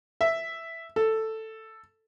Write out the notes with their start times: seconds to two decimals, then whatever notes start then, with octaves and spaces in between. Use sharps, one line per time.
0.21 E5
0.96 A4